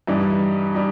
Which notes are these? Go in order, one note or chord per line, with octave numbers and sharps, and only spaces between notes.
G2 E3 G3 D#4
G3 D#4